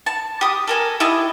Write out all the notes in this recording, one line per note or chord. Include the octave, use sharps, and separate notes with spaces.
A5
G4 D#6
A4 A#4 G#5
E4 G4 D#5 A5